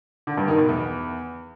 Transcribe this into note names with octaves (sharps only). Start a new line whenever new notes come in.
D3
G2
D#3
B2
E2